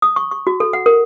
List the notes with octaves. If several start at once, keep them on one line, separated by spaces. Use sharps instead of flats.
D#6
C#6
C#6
F#4
A4
F#5
A#4